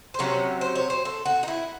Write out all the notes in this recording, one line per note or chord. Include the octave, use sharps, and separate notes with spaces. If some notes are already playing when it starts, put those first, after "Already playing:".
C5
C3 F#3 C#4 C#5
C5
C#5
C5
A4
F#4
D#4
E4